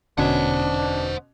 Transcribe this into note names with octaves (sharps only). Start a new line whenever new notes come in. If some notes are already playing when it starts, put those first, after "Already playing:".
E1 B2 D3 C#4 D4 C5 F#5